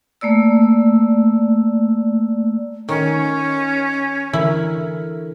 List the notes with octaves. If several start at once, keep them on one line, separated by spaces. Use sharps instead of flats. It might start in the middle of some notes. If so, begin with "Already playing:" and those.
A3 A#3 D5 E6
D#3 C#4
D3 E3 E4 A#4